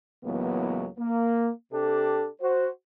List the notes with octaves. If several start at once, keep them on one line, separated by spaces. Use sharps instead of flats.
C#2 A2 E3 F#3 A#3 B3
A#3
C3 D4 G4 A4
F#4 C5